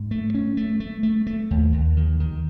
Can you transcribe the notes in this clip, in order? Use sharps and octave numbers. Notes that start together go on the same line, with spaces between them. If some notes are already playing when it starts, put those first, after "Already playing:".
Already playing: G#2
A3
C#4
A3
A3
A3
A3
D#2
D#2
D#3
D#3